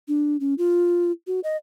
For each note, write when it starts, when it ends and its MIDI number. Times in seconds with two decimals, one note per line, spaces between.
0.08 0.37 62
0.40 0.54 61
0.58 1.12 65
1.27 1.40 66
1.44 1.57 75